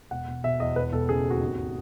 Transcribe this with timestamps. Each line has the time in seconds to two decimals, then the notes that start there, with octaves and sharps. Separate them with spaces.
0.11 E1 F#5
0.28 E1
0.44 B2 E5
0.60 E2 D#5
0.76 E1 B4
0.92 E1 A4
1.09 C#3 G#4
1.25 D#2
1.30 F#4
1.41 G#1